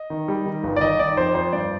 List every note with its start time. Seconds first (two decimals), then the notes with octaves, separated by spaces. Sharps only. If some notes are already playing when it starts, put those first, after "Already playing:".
Already playing: D#5
0.10 D#3
0.28 G3
0.46 D#3
0.63 G1
0.76 D5
0.81 D#3 D#5
0.99 D#3 D5
1.17 F2 C5
1.35 F2 C5
1.53 G2 D5